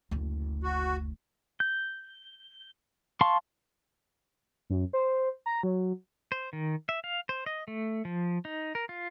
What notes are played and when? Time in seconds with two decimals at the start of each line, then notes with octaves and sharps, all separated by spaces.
0.11 F#1 D2
0.63 F#4
1.60 G6
3.21 F5 A5 C6 C#6
4.70 F#2
4.93 C5
5.46 A#5
5.63 F#3
6.32 C5
6.53 D#3
6.89 E5
7.04 F5
7.29 C5
7.46 D#5
7.68 A3
8.05 F3
8.45 D#4
8.75 A#4
8.89 F4